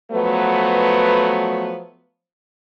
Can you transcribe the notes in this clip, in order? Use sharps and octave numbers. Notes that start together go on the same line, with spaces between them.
F3 F#3 A3 B3 B4